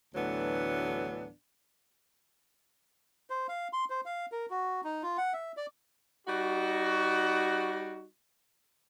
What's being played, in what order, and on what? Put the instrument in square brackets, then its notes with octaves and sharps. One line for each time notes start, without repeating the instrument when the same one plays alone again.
[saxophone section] D2 A2 E3 F#3 B3 D4
[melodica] C5
F5
C6
C5
F5
A#4
F#4
D#4
F4
F#5
E5
D5
[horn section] G3 D#4 F#4